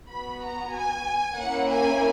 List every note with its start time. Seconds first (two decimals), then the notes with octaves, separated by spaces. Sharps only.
0.10 B3 F#4 B5
0.43 A#5
0.75 G#5
1.39 A#3 C#4 E4 F#5
1.71 G#5